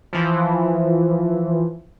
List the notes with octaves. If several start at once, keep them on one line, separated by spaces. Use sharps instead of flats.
E3 F3